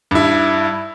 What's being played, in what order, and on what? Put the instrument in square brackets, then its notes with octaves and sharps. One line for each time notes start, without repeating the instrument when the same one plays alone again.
[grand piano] G2 E4